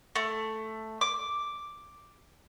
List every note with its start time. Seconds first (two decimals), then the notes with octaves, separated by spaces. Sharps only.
0.16 A3
1.01 D6